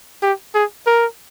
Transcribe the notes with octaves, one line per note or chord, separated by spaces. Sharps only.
G4
G#4
A#4